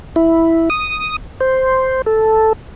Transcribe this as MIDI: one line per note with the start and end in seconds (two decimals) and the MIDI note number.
0.16 0.69 64
0.70 1.16 87
1.40 2.02 72
2.06 2.53 69